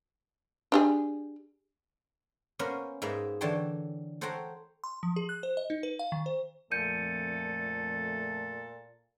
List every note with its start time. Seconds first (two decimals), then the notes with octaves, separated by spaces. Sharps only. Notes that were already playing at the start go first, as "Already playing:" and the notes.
0.72 D4 G4 G#4
2.59 A#3 B3 C#4 A#4 C5 F#5
3.02 G#2 G#3 A#3 D#4 B4 E5
3.41 D3 E3 C#5 G5 A5 C6
4.21 A4 C5 C#5 F#5 G5 A#5
4.84 C6
5.03 F3
5.16 G#4
5.29 F#6
5.43 C5
5.57 D#5
5.70 D#4
5.83 B4
5.99 F5
6.12 D#3
6.26 C5
6.71 F2 A#2 A3 A4 G6 C#7 D#7